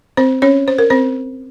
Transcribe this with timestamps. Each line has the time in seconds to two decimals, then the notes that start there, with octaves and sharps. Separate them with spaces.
0.17 C4 C5
0.42 C#4 C#5
0.68 C5
0.78 A#4
0.90 C4 C5